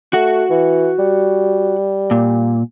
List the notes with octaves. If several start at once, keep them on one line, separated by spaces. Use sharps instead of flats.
A3 F#4 F#5
E3
G3
A#2